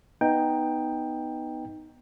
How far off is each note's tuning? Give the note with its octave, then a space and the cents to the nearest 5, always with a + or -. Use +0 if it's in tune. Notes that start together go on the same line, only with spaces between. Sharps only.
B3 +0 D#4 +0 G5 +10